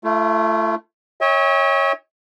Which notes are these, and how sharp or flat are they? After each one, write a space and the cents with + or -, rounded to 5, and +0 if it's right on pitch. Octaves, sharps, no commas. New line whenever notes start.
A3 +0 F4 -45
C#5 +0 E5 -45 G5 +30